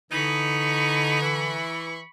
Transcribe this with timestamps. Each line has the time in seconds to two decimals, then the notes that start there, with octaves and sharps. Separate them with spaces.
0.11 D3 E3 D#4 B5 C#6
1.21 E3